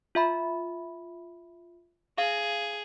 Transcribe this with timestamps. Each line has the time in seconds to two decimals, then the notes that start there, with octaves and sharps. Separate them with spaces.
0.15 F4 E5 B5
2.18 G#4 F5